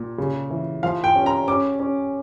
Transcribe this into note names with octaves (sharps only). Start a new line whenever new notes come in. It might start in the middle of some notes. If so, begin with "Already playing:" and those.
Already playing: A#2
C#3
E3
F3 F5
G5
C#4
A#5
C#4 D6
C#4